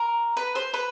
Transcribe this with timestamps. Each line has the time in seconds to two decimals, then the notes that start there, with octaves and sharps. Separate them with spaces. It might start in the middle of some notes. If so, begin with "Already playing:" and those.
Already playing: A#4
0.37 B4
0.55 C5
0.74 B4